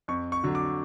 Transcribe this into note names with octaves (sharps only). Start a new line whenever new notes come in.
F2 C#6
C#6
D3 F#3
D6